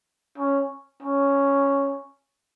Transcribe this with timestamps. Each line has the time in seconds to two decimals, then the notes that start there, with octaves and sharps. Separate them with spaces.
0.38 C#4
1.03 C#4